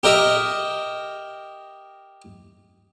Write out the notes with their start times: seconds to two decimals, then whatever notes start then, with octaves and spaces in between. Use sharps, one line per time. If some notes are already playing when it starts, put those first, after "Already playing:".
0.03 G4 A#4 D#5 E5